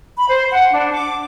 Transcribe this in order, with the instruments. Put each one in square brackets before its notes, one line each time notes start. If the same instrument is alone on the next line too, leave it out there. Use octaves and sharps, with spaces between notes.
[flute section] B5
C5
F#5
D4
D6